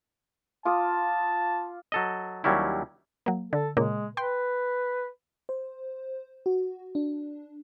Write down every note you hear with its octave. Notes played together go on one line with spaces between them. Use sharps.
F4 A5 D6 D#6
F#3 A4 D#5
D#2 F#3 G3 C#4 E4
F#3 A#3
D3 A4
A#2 C#3 G#3 A#3
B4 G5 C6
C5
F#4
D4